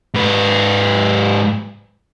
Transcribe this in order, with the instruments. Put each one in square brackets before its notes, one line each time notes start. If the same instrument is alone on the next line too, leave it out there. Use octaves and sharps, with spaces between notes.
[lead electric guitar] G#2 B4